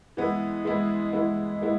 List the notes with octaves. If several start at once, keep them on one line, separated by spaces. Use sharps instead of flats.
E3 G#3 B3 E4
E3 G#3 B3 E4
E3 G#3 B3 E4
E3 G#3 B3 E4